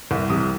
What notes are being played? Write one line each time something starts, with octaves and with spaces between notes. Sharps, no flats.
C2
C3 D#6